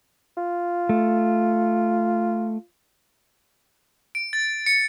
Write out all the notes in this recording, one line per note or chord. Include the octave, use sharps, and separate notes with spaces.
F4
A3
D7
A6
C#7